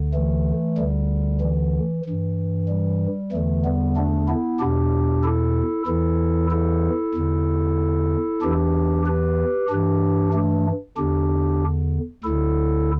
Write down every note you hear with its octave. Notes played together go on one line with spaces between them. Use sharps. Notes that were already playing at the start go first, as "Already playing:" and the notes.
Already playing: D2 D3
E3 A3
D2 D3 G3
E3
G2 E3
G3
E2 D3 E3 A3
G3 B3
A3 D4
B3 E4
E2 B2 D4 G4
E4 A4
E2 E3 E4 A4
E4 A4
E2 D3
E2 E3 D4 G4
G4 B4
G2 E3 D4 G4
A3 D4
E2 D3 D4 G4
D2 D3 E4 A4